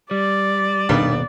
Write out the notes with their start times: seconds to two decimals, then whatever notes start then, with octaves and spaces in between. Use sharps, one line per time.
0.11 G3 D5
0.89 D#1 G2 B2 D#3 B3